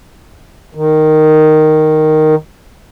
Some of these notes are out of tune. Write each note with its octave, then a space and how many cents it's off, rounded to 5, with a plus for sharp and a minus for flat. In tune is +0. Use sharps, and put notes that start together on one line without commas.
D#3 -5